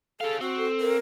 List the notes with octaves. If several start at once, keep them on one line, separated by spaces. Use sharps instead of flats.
G#4 A4 F5
C4 F#4
A4
A#4